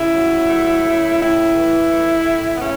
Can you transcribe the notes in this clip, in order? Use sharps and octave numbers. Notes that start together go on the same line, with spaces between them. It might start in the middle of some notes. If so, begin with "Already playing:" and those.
Already playing: C#3 E4
F#3
A3
C#3
A2 E4
E3
A3
A2
B3
C#3 C#4